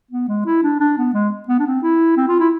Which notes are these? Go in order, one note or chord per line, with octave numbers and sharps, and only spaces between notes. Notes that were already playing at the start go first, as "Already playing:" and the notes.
B3
G#3
E4
D4
D4
B3
G#3
B3
D4
C4
E4
C4
F4
E4